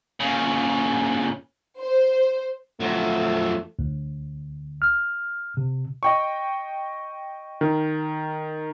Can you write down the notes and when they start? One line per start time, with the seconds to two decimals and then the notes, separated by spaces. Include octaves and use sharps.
0.20 A#2 C#3
1.79 C5
2.80 F2 F#3 A3
3.79 D2
4.82 F6
5.57 C3
6.03 D#5 G5 C#6
7.61 D#3